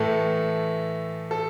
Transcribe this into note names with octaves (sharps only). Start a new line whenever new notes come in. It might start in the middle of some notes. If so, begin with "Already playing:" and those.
Already playing: A2 E3 A3 A4
A4